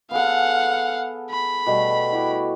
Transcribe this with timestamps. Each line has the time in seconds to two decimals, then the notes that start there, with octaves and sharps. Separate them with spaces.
0.11 B3 G#4 A4 F5 F#5
1.30 B5
1.66 B2 G3 A3
2.12 E4 F#4 G4